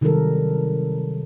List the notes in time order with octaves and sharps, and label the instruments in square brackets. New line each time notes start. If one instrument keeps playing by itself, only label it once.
[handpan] C3 D#3 F#3 G3 A4 A#4